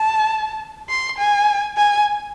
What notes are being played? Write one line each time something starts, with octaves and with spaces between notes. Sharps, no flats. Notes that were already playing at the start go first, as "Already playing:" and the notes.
Already playing: A5
C6
G#5
G#5